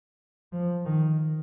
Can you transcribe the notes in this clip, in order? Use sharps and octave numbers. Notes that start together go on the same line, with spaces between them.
F3
D#3